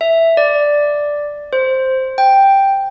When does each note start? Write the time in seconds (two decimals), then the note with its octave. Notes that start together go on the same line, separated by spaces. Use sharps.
0.01 E5
0.37 D5
1.53 C5
2.18 G5